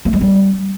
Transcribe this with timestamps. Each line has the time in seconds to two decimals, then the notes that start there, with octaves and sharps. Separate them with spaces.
0.05 A#3
0.13 G#3
0.21 G3